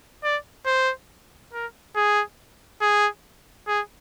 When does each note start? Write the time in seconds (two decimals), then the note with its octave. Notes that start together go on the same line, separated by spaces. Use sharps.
0.24 D5
0.66 C5
1.53 A#4
1.96 G#4
2.81 G#4
3.67 G#4